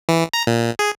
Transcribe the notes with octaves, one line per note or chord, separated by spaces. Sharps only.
E3
A#5
A#2
G#4